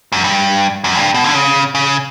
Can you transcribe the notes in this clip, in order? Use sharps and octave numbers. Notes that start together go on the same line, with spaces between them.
F#2
G2
F#2
A2
G2
B2
D3
C#3
C#3